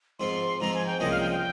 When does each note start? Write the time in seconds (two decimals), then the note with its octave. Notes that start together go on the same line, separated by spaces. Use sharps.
0.19 G#2 F3 C4 C6
0.60 G#2 F3 C4 A#5
0.74 G#5
0.86 G5
1.00 C2 A#2 F3 G#3 C#4 D#5
1.11 F5
1.20 G5
1.31 G5